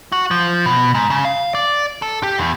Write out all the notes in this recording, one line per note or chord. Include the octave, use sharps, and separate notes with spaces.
F#4
F3
B2
G#2
C#3
F5
D5
A4
G4
E2